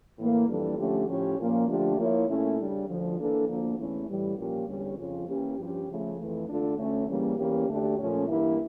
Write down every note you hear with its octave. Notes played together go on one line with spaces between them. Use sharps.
A2 E3 A#3
F2 E3 G3 D4 A4
D3 F3 A3 C#4 G4
A2 F3 C#4 G4 C#5
A#2 F3 A#3 C#4
D3 F3 A3 D4 G4
F3 A#3 E4 A#4 C#5
A#2 A3 C#4 E4
C#3 G3 D4
D2 D3 F3
E3 A#3 D4 A4
D2 D3 F3 A#3
E2 E3 A3 C#4 E4
A2 E3 G3
A#2 F3 A#3 C#4 G4
E2 D3 G3 C#4
F2 C#3 F3 C#4 F4
E3 A#3 C#4 G4
G2 F3 C#4 G4
C#3 F3 A3
F2 E3 A3
D3 A3 D4 F4 A4
D2 D3 A3 C#4
C#3 E3 G3 A#3 C#4
E2 E3 A#3 C#4 G4
D2 D3 A3 D4 G4
A#2 F3 A3 C#4
G2 E3 A#3 E4